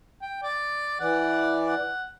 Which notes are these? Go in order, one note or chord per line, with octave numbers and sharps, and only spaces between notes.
G5
D5
E3 D5 F#5
F#5